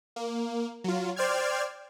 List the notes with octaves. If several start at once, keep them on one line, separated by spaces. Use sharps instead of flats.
A#3
F#3 F4
C5 D5 G5 F6 G#6